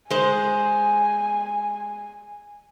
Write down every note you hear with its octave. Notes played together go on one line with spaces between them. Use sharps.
G#3 C5 G#5